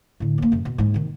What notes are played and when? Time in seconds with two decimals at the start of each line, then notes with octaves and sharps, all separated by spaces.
0.20 A2 D3
0.38 D#2 A#3
0.52 F#2 C3
0.65 B2
0.78 G#2 G#3
0.94 C3 D#3